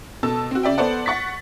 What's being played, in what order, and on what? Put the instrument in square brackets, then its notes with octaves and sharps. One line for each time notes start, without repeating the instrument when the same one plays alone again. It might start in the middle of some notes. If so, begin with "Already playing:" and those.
[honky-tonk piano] B2 A4 A5 E6
C4 F#4
C#3 D5 E5 G5
B3 A4 C5 D5 F#5
F#5 C#6 A6 B6